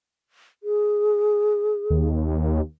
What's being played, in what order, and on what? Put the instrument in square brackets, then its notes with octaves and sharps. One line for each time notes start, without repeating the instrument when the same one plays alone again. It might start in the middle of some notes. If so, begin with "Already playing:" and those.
[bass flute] G#4
[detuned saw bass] D#2